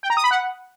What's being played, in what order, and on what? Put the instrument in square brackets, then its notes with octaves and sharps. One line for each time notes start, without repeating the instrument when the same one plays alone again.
[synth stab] G5
A#5
D#6
B5
F#5